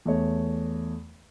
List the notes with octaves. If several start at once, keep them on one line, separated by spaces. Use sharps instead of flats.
E2 A3 C#5